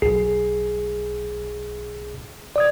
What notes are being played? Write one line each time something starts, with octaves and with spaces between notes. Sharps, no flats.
B1 G#4 C7
D5 D#6 G#6